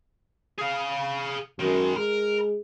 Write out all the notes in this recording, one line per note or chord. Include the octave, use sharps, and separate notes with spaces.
G#4 F5
F#2 D#3 G#3
G#3 A#4